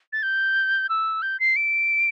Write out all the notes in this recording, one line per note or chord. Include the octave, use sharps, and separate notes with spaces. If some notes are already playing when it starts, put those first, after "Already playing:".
A6
G6
E6
G6
C7
D7